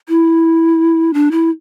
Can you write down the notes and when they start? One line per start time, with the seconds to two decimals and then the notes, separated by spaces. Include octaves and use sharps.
0.09 E4
1.14 D4
1.31 E4